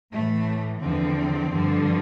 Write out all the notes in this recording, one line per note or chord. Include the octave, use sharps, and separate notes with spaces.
A2 E3 A3
E2 D3 F3 C4
G2 D3 F3